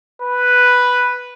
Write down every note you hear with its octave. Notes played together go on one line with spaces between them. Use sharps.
B4